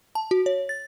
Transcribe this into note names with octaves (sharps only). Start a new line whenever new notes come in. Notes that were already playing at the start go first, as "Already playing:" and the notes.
A5
F#4
C#5
A6